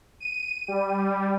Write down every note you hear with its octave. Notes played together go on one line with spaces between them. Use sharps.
D#7
G3